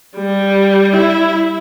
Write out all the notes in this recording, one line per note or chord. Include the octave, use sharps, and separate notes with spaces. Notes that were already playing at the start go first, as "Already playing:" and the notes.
G3
E4